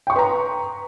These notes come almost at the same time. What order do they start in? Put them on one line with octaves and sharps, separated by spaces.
G5 C#6 C6 B4 A#5